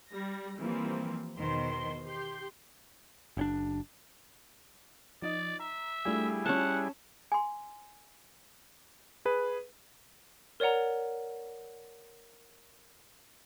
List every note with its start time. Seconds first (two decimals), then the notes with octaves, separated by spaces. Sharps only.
0.11 G3 A#6
0.58 E3 F3 G3 A#3 C4
1.38 E2 B2 D#3 C5 C6
2.06 G4 C6 G6
3.37 F#1 C#4 D4
5.22 F3 D#4 D5 D#5
5.60 E5 A#5
6.05 G3 A3 D4 E4 F4 G#4
6.46 C#4 F#5 A5
7.32 G#5 C6
9.25 G#4 B4
10.60 A#4 C#5 D5 F#5 A#5